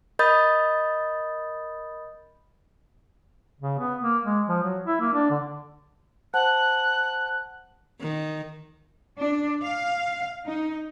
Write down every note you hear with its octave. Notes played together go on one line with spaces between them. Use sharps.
A#4 D#5 B5 D#6 G6 A6
C#3
B3
A#3
G#3
F3
F#3
E4
A#3
D4
D3
C5 F#5 A5 F#6
D#3
D4
F5
D#4